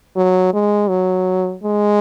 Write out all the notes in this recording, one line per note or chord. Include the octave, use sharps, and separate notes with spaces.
F#3
G#3
F#3
G#3